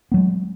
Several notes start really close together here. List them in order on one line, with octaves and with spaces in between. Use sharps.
B3 F#3 G#3